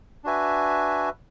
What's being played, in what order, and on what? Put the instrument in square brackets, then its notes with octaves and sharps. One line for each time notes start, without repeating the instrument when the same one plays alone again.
[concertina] D4 F#4 B4 E5 G#5